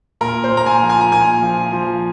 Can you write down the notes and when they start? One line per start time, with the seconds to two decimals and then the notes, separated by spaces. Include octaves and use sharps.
0.21 A#2 A#4
0.44 C5
0.52 A#2
0.57 A#5
0.66 G#5
0.82 F3
0.89 G#5
1.01 A#5
1.12 A#2 G#5
1.42 F3
1.72 F3